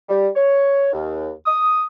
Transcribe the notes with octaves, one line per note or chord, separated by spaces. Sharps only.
G3
C#5
D#2
D#6